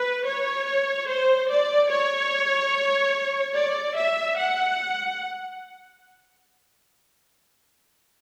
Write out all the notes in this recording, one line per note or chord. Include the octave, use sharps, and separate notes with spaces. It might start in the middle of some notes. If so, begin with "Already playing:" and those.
Already playing: B4
C#5
C5
D5
C#5
D5
E5
F#5